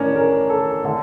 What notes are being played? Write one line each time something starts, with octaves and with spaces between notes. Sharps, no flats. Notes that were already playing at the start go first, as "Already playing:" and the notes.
Already playing: A1 A2 C#4 D4 A#4 C#5
A#4
A4
D3 A3 A4